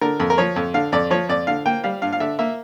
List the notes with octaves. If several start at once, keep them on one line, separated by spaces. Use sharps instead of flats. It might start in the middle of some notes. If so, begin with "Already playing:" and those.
D3 A#4
F2
A#4
F3 C#5
F2
D3 F5
F2 D5
F3 C#5
F2 D5
D3 F5
A#3 G5
G3 F5
G2 F5
F5
D3 E5
A#3 E5